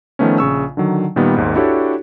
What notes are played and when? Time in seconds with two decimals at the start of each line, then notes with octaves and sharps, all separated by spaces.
0.19 D#3 F3 A3 B3 C#4
0.38 A#1 C#3 C#6 E6
0.77 D3 D#3 F#3
1.16 A#2 D#3 G3 B3
1.36 G#1 D#2 G#2
1.55 D4 E4 F#4 G4 A4 C#5